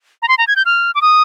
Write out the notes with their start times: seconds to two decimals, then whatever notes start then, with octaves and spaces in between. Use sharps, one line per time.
0.22 A#5
0.28 C6
0.38 A#5
0.48 G#6
0.56 G6
0.65 F6
0.95 D6
1.02 D#6